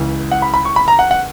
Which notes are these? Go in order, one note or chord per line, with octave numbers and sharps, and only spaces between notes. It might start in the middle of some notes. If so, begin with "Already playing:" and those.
Already playing: C#2 C#3 E3
F#5
B5
B5
C#6
B5
A#5
F#5
F#5